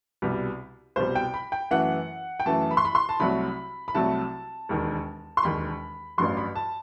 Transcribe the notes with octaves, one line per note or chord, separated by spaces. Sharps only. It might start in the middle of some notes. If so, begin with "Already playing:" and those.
C2 B2 G3
C2 B2 G3 C5
G5
B5
G5
F#2 E3 A3 F#5
G5
F#2 E3 A3 A5
B5
C6
B5
C6
A5
C2 C3 F#3 A3 B5
B5
C2 C3 F#3 A3 A5
E1 D#2 D#3
C6
E1 D#2 D#3 B5
A1 G2 F#3 C6
B5
A5